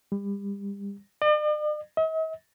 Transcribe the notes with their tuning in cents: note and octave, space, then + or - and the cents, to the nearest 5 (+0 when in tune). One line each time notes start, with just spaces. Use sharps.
G3 +35
D5 +45
D#5 +45